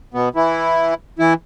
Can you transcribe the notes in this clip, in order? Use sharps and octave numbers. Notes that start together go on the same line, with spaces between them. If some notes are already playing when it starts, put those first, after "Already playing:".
B2 B3
E3 E4
E3 E4